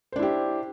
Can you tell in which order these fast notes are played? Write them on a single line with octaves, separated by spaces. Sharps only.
C5 D4 E4 G4